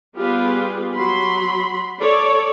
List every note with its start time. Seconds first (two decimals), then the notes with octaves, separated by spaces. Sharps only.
0.15 G3 B3 F4 G4 G#4 B4
0.95 F#3 B5 C6
1.99 A4 C#5 D5